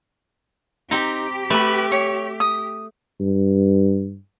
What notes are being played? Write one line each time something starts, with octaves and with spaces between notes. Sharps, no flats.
C4 D#4 G4 A#5
A3 B4 B5
C#5
D#6
G2